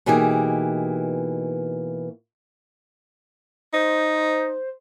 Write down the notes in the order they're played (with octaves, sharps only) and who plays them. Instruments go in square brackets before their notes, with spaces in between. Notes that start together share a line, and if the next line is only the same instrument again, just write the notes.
[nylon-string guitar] B2 E3 A#3 D#4 G4 G#4
[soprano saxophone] D#4 [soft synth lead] C5